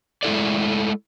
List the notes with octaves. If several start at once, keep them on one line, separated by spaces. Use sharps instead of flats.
G#3 A3 E4 A4 D5